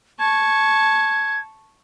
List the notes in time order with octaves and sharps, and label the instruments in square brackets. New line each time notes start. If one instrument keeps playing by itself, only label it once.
[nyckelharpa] A5 C#6 [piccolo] G#6